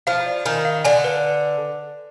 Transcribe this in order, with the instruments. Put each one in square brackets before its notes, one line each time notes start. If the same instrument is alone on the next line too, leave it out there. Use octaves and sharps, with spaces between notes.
[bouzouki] F3 [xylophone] F5
[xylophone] D5
[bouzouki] D#3 [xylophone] G#5
[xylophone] F5
[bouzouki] D3 [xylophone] G#5
[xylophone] B4